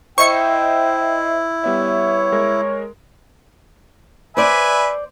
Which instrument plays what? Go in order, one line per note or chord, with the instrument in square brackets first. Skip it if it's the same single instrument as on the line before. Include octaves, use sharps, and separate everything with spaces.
[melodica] E4 [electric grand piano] C5 D#5 E5 [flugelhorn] G5 [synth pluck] C#6 C#7
[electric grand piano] G3 B3 E5 [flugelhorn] C#5
[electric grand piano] G#3 A#4
[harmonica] B4 E5 G#5 [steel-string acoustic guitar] C5 D5